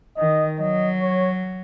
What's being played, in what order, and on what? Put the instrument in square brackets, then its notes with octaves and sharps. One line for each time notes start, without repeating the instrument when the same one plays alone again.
[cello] D#3 [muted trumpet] D#5
[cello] F#3 [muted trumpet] D#5
[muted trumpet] C#5